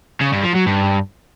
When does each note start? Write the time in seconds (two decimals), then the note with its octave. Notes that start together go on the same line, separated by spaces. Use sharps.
0.21 C#3
0.33 G2
0.44 F3
0.56 F#3
0.67 G2